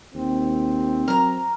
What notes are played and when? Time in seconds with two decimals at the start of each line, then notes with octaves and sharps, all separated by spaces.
0.14 D#2 C4
1.08 F#3 A#4 A#5